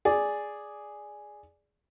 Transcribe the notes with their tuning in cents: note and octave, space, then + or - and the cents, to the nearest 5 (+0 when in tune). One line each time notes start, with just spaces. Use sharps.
G#4 +0 D5 +0